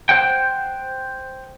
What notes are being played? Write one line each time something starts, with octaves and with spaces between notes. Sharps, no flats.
C5 F#5 G5